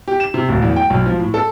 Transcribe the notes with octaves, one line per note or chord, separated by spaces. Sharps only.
G4
E7
C3
D1
E2
G5
B1
F3
A2
A4